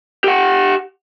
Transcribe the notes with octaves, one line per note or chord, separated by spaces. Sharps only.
G4 F#5